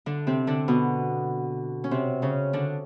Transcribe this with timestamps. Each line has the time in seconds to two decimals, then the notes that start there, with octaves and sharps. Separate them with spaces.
0.06 D3 D4
0.27 C3 C4
0.47 D3 D4
0.68 B2 B3
1.84 C#4
1.91 C3 C4
2.22 C#3 C#4
2.53 D3 D4